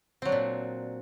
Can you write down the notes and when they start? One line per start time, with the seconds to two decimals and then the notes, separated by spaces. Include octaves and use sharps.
0.22 C4
0.25 F#3
0.29 D4
0.32 A#2